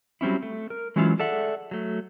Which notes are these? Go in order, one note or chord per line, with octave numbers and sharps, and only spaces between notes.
F#3 G3 C4 C#4 E4
A3
A#4
E3 F#3 G#3 C#4 E4 F4
G#4 A4 D5 E5 F#5
F#3 A3